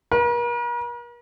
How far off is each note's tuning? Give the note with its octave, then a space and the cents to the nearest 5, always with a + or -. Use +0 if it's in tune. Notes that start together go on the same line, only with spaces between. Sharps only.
A#4 +45